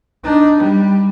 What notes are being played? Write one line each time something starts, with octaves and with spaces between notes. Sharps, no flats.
D4 D#4
G3